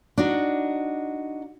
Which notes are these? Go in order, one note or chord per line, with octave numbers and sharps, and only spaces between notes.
D4 D#4 F#4